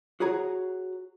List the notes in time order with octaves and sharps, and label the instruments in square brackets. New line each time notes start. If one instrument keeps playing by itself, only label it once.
[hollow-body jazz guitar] F#4 G#4 C#5 A#5